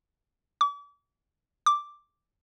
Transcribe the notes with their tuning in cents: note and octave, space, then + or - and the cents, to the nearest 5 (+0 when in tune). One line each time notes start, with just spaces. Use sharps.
D6 -40
D6 +0